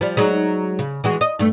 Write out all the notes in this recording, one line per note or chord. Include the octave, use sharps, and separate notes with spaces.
F3 G3
F#3 G#3 D#4
C#3
E3 G#3 F#4
D#5
G2 A3